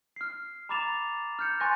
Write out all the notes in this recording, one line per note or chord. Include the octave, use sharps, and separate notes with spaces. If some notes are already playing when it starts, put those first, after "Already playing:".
F6 C7
A#5 B5 D6 A6 E7 F7
F6 G6 C#7
G#5 C6 C#6 F#6 A6 A#6